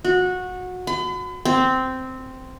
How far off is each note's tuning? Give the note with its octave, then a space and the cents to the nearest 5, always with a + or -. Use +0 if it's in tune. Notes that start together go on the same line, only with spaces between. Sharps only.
F#4 -20
B5 +40
C4 -10